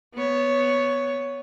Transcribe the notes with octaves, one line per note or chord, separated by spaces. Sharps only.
B3 C#5